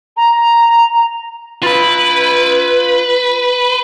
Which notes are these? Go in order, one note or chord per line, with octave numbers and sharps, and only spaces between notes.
A#5
F4 B4 B5